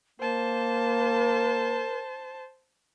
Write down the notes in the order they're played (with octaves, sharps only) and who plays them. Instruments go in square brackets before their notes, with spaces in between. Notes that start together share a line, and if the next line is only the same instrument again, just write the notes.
[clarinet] A#3 [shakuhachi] A#4 [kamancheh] C5 A5